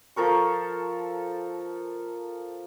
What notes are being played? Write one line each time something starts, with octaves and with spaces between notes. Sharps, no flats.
F3 A4 A#4 C#6